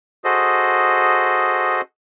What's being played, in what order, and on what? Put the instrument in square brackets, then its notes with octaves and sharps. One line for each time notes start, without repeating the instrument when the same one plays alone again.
[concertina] F#4 G#4 A4 C5 D#5